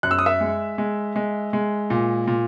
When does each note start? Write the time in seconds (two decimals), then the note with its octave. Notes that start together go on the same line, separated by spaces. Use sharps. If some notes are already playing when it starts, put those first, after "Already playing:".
0.03 F#2 F#6
0.11 E6
0.19 D#6
0.26 E5 E6
0.41 G#3
0.78 G#3
1.16 G#3
1.53 G#3
1.90 A#2
2.28 A#2